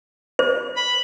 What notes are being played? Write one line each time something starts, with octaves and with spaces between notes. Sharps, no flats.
C5
B5